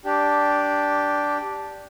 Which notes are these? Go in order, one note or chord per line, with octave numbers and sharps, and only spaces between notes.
D4 G4